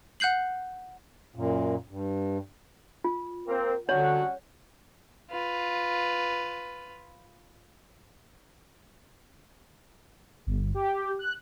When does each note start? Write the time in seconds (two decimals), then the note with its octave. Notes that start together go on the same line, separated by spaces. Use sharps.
0.20 F#5 F#6 G6 C7 F#7
1.35 F#2 A#2
1.88 G2
3.04 F4
3.48 A#3 C4 A#4
3.89 D3 F#3 G3 C#4 D4 F#4 C#5 F#5
5.31 F4 B4
10.46 G1
10.74 G4
11.19 F#6